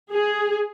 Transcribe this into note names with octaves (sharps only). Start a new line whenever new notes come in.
G#4